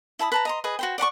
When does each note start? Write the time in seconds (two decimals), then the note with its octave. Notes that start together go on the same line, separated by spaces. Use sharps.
0.19 E4 A5 B5 D#6
0.32 B4 A5 A#5
0.45 D#5 A#5 C6
0.64 G#4 B4 D#5
0.79 F#4 C5 G5
0.98 D5 F#5 A5 C#6